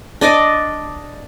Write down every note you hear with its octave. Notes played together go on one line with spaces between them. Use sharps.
D4 D5 D#5 D6